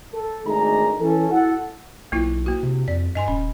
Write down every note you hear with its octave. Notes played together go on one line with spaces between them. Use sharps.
A4
G#1 A3 D4 D#4 G#4 A#5
E3 C#4 A4
E4 F#4 A4 F#5
B1 A#3 E4 F4
A#3 F#4
C3
F2 D5
G2 D#5 G#5 C6
D#1 C#4